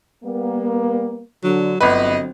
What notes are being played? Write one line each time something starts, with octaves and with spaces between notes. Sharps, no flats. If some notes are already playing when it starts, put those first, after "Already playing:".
G3 A#3 B3
D3 F#3
G1 D3 F#3 C4 B4 D#5